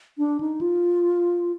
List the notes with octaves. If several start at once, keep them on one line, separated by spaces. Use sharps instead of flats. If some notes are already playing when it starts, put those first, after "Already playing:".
D4
D#4
F4